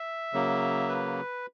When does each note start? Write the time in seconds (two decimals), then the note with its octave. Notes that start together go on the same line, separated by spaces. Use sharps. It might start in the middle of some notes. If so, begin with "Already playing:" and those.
Already playing: E5
0.33 C#3 F#3 A#3
0.89 B4